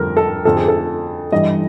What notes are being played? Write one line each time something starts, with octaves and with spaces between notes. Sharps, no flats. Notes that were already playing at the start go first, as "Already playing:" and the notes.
Already playing: F2 D3 G3 A#4
A4
F2 D3 F3 A4
G#4
A4
G2 E3 G3 D#5